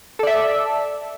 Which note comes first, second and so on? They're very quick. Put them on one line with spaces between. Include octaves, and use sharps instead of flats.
A4 D5 E5